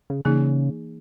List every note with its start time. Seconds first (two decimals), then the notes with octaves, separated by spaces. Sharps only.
0.10 C#3
0.25 C#3 E3 A#3 D#4 G#4